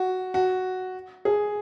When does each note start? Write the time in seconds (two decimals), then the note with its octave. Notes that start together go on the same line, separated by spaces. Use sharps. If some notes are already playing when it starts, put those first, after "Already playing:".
Already playing: F#4
0.34 F#4
1.25 G#4